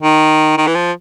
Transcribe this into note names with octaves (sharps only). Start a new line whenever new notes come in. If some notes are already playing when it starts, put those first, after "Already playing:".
D#3
D#3
E3
F3